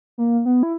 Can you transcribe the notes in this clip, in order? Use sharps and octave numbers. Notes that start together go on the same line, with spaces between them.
A#3
B3
E4